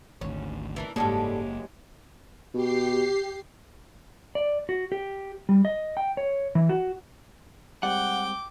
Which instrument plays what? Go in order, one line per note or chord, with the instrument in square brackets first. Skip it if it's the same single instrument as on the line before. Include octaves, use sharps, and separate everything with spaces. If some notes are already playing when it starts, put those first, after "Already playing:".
[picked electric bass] G#1 D2 [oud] C#4
[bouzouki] E3 D4 A#4
[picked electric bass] F#1 A#3 [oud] G#2 G3 A4 [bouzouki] G#3 C#4 G4
[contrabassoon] B2 [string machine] G4 C7
[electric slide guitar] D5
F#4
G4
G3
D#5
G5
C#5
E3
F#4
[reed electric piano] G3 G#3 C4 [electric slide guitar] F#5 [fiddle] G5 [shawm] D6